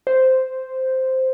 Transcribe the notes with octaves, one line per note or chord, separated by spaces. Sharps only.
C5